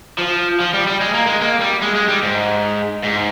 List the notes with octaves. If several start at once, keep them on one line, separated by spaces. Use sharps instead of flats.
F3
F3
G3
G3
G#3
A#3
G#3
A#3
G3
G#3
G#3
G3
G#2
G#2